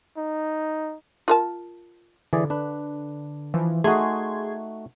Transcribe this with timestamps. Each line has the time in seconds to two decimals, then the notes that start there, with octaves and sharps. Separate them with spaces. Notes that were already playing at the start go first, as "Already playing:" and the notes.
0.17 D#4
1.28 F4 A#4 A5
2.33 D3 E3 G#4 D5
2.50 D4 B4
3.54 E3 F3
3.84 A3 D#4 F#4 G#4 C6 G#6